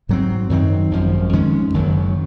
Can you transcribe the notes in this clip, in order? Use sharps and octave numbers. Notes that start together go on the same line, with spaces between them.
G#2 F#3 C4
F#2 D#3 F#3 C4
G#1 F#2 F3
F2 D#3 G#3 C#4
F#1 F#2 D#3 F#3